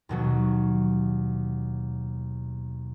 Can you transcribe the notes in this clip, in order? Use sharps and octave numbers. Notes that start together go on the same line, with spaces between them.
D#2 B2 F#3